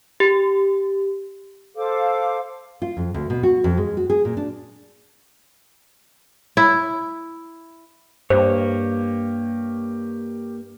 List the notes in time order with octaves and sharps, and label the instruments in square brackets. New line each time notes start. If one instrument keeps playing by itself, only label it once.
[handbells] G4
[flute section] A4 C5 F5 D6
[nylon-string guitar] F4
F2
D2
B2
F#4
F2
G#3
F#4
G#4
A#2
D4
[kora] E4
[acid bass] G2 [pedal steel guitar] A#3 C#5 [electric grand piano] G4 [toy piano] C5